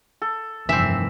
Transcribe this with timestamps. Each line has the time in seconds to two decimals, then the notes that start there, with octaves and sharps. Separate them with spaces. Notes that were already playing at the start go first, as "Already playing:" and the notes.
0.22 A4
0.69 F1 G2 D#3 E3 C4 E5